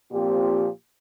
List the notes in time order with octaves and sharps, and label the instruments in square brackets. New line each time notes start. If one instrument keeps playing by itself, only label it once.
[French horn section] A#2 F3 C4 G4